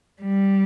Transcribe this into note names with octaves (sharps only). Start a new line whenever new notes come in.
G3